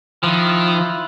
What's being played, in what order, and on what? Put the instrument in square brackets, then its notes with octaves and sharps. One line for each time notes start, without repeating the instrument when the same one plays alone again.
[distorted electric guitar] D#3 [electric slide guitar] F3 [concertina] E4 F4 F#6